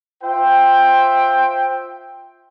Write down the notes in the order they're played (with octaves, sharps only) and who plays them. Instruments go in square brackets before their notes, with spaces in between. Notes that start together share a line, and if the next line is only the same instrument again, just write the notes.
[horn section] F4 C5 E5 G5